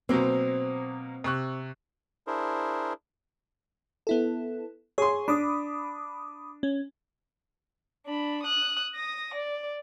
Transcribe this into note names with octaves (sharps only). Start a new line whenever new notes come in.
B2 F#3 A#3 C4 C5
C3 C#6 F#6
D4 E4 G#4 A#4 C5
B3 E4 A4
G#4 C#5 C6
D4 B5 D6 D#6
C#4
D4 B5
D#6 F#6
D#6 A#6
D5